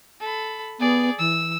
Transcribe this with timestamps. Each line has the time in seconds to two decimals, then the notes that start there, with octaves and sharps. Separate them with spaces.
0.20 A4 B5
0.80 B3 G#4 D5
1.19 E3 E6